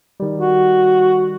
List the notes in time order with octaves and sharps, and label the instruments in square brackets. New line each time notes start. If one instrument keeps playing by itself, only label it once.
[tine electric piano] D#3 G3
[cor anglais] F#4